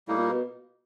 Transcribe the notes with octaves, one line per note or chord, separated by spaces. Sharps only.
A2 G3 A#3 D#4
A#2
B2